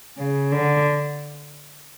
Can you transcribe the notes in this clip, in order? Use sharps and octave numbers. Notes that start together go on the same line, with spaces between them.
C#3
D3